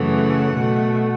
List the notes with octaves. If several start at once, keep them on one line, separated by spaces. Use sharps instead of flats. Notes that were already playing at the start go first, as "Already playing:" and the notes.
Already playing: F#2 C#3 E3 A3 F#5
B2 A3